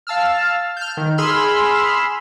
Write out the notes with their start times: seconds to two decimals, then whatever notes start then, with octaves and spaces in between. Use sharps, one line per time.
0.07 F5 A5 E6 F6
0.77 F6 G6
0.97 D#3
1.18 G#4 B5 C6 E6 F6